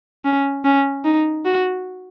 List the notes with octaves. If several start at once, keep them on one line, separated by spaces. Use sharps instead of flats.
C#4
C#4
D#4
F#4